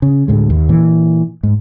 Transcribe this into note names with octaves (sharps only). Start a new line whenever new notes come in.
C#3
D2 A2 G#3
D#2
A#2 E3
G#2